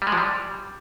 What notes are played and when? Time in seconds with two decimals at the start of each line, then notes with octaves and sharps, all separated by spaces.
0.02 G3
0.07 G#3
0.12 F3
0.17 G3